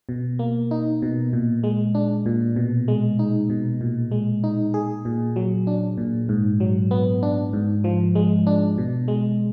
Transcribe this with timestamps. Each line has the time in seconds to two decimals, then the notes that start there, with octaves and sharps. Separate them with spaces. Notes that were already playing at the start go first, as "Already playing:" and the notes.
0.09 B2
0.39 A#3
0.71 D#4
1.02 B2
1.33 A#2
1.64 G#3
1.95 D4
2.26 A#2
2.56 B2
2.88 G#3
3.19 D#4
3.50 B2
3.81 A#2
4.11 G#3
4.44 D#4
4.74 G#4
5.05 A#2
5.36 F#3
5.67 D4
5.98 A#2
6.29 G#2
6.60 F#3
6.91 B3
7.23 D4
7.53 G#2
7.84 F3
8.15 G#3
8.47 D4
8.78 B2
9.08 G#3